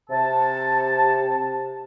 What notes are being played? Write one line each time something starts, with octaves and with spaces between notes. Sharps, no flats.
C3 A5